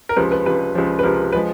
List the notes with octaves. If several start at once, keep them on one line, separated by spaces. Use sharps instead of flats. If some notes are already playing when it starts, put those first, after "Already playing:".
A#4
C#2 C3 F3 B4
B4
C#2 C3 F3 B4
C#2 C3 F3
B4
C#2 C3 F3 A#4
F3 G#3 B4